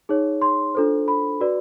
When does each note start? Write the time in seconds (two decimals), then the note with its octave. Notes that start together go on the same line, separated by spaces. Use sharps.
0.09 D#4 G#4 C#5
0.42 C6
0.75 D4 F4 A4 C5
1.08 B5
1.40 F#4 B4 D5